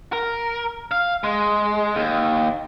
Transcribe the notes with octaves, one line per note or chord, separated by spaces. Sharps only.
A#4
F5
G#3
D#2